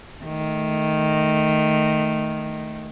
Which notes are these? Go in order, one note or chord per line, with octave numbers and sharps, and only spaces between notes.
D#3 A3